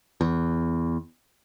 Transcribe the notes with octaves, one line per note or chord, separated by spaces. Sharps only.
E2